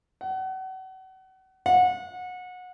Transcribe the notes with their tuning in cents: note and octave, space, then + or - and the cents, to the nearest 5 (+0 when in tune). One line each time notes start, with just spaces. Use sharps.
F#5 +35
F#5 -25